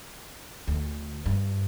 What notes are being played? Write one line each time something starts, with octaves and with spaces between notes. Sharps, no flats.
D2
G2